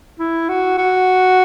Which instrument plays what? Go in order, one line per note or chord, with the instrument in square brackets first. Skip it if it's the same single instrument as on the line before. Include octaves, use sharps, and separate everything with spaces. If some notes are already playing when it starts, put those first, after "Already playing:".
[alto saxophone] E4
F#4
F#4